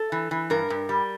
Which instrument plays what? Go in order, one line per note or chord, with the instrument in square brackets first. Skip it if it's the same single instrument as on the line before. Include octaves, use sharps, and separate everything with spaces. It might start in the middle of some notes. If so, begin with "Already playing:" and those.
Already playing: [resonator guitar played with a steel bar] A4
E3
E3
G2 A#4
G2
G3